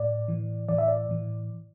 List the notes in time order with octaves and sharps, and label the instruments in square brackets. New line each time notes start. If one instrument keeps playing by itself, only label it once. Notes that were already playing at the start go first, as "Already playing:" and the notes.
Already playing: [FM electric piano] A2 D5
A2 E3
A2 E3 D5
E5
D5
A2 E3